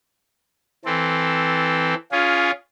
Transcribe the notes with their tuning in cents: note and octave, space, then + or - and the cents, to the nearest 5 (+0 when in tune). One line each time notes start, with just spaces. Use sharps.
E3 +0 C4 +0 A4 +0
C#4 +25 F4 +0 G#4 +0